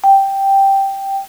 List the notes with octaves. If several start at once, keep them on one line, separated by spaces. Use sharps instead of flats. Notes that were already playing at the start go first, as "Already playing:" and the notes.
G5